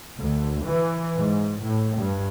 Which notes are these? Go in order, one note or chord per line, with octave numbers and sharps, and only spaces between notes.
D2
E3
G#2
A2
G2